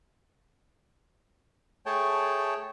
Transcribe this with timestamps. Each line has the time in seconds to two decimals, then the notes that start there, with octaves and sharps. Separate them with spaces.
1.86 A3 G#4 C#5 G5 A5